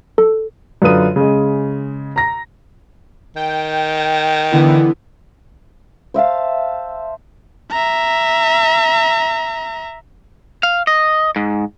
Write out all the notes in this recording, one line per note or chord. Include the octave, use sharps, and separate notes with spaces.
A4
F#2 D3 F4 B4 D#6 D#7
C#3 G#3
A#5 A#6
D#3 G5
D3 E3 B3 E4
C5 E5 F5 A5
E5 A#5
F5
D#5
G#2